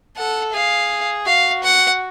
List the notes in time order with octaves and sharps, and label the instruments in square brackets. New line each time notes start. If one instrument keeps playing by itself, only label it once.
[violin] A4 [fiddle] F#5
[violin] G#4 [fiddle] F5
[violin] F#4 [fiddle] F5
[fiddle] F#5